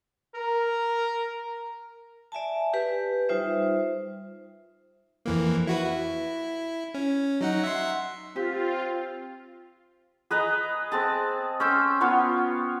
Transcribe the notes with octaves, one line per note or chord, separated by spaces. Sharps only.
A#4
D5 E5 G#5 A5
G4 B4
G3 D#4 F4 C5 E5
F2 E3 A#3
E4 F#4 B4
E4
C#4
F#3 D#4 F#5
E5 F#5 C6
C4 F4 G4
G#4 B4 D#5 A#5
C4 G#4 A5
C#4 C5 G5 E6
B3 F4 C#5 F5